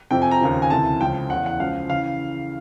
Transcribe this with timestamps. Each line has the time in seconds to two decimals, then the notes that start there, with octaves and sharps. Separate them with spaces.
0.11 F2 C3 F3 G5
0.22 G#5
0.31 A#5
0.41 D#2 C#3 F3
0.62 G#5
0.70 D2 C3 E3 A5
1.00 C#2 C#3 F3 G5
1.30 E2 C#3 E3 F#5
1.46 F#5
1.60 C#2 C#3 F3 F5
1.90 C#3 E3 F5